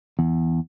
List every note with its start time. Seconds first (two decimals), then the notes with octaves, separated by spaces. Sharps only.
0.19 E2